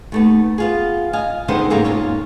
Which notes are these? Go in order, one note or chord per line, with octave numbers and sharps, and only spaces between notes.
D#2 A3 B3
B3 F4 G#4
D#5 F5 G#5
D3 D#3 G#3 B3 C4 C5
G#2 C#3 G3 A#3 G#4 A4
E2 G#2 A#3 F4 C#5